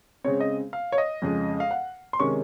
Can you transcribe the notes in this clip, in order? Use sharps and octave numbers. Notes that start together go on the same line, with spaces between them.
C#3 G#3 C4 C#5
D#5
F5
C#5
D#5
F2 C#3 G#3
F5
F#5
C6
C3 D#3 G#3 C#4 C#6